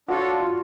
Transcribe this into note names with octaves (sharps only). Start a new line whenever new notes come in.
D4 F4 F#4 A4 C#5
F4